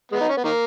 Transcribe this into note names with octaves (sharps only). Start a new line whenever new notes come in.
G#3 B3
D#4
C#4
B3
D#3 A#3